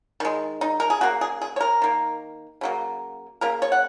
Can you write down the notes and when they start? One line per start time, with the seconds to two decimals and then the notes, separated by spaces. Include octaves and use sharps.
0.20 D#3 G#3
0.61 D#4
0.80 A#4
0.90 G#4
1.01 C#3 A#3 F#4
1.21 G#4
1.42 G#4
1.56 C#5
1.60 A#4
1.82 D#3 A#3
2.61 C#3 F#3 A#3
3.41 C#3 A#3 A#4
3.62 C#5
3.72 F#5